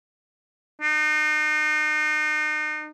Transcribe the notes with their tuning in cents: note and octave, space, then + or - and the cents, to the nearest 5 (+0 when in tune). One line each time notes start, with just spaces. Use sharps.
D#4 -35